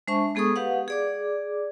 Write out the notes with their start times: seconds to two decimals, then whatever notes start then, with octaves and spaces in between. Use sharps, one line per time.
0.08 G#3 D4 C5 E5 A5 C#6
0.35 G#3 B3 G#4 A4 C#6 D#6
0.56 G4 B4 F5 F#5
0.88 G#4 D5 D6